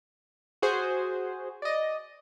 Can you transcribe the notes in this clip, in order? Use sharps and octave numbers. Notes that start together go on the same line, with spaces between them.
F#4 G#4 C5
D5 D#5